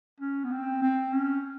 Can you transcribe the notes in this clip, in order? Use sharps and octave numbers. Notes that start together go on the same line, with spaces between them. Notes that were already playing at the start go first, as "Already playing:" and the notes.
C#4
B3
C4
C4
C#4